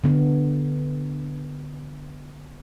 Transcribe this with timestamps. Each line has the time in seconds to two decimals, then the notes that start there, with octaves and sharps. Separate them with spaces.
0.04 D3 B3